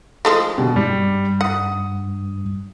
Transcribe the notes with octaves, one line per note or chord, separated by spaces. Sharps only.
F3 G#3 A3
B2 D3 G3 G4
G2 G3
F#5 D#6